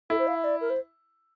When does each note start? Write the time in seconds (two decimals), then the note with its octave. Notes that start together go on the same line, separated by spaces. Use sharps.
0.10 E4 A4
0.19 C5
0.27 F5
0.35 E5
0.44 D5
0.61 A#4
0.70 C5